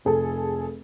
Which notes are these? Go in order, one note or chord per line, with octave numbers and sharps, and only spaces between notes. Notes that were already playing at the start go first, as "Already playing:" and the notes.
F1 G#4 A4